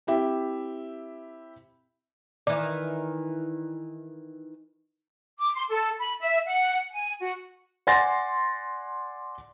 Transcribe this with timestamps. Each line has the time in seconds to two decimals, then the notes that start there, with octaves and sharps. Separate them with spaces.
0.07 C4 E4 G4 E5
2.47 D#3 E3 D5
5.38 D6
5.54 C6
5.69 A4
5.98 B5
6.21 E5
6.46 F#5
6.91 G#5
7.19 F#4
7.87 D5 F#5 G#5 C6 A6 A#6